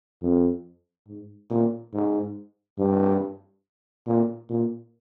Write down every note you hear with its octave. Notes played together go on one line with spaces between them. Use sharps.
F2
G#2
A#2
G#2
G2
A#2
A#2